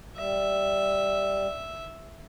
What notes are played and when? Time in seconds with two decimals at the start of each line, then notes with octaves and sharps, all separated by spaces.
0.17 G3 E5